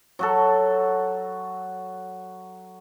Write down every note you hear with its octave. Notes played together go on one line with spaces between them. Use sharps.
F#3 F#4 A4